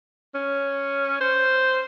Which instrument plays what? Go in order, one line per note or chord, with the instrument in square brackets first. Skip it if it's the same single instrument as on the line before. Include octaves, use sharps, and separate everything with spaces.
[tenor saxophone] C#4
C5